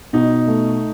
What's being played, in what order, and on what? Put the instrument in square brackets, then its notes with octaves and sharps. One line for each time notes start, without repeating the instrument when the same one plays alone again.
[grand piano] B2 [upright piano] D#4
[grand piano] A3